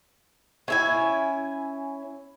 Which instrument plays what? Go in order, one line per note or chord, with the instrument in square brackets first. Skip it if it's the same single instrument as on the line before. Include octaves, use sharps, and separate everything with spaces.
[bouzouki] C#4 E4 G#5